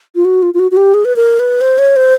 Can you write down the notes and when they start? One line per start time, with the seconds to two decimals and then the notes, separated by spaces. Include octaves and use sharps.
0.15 F4
0.25 F#4
0.42 F4
0.54 F4
0.59 F#4
0.71 F#4
0.77 G4
0.94 G#4
1.05 B4
1.16 A#4
1.39 B4
1.61 C5
1.78 C#5
1.96 C5